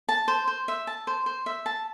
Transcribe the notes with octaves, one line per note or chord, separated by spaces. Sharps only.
A5
C5
C5
E5
A5
C5
C5
E5
A5